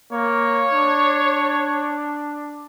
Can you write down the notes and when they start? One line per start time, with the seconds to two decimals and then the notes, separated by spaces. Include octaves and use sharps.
0.12 A#3 C#5
0.73 D4